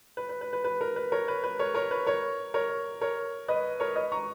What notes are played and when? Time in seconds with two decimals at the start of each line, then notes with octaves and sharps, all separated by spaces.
0.17 B4
0.29 B4
0.41 B4
0.53 B4
0.64 B4
0.81 A#4
0.96 B4
1.12 A#4 C#5
1.28 B4
1.44 B4
1.59 A#4 C#5
1.75 A#4 C#5
1.91 B4
2.07 A#4 C#5
2.54 A#4 C#5
3.01 A#4 C#5
3.48 B4 D#5
3.80 A#4 C#5
3.96 B4 D#5
4.12 A#5 C#6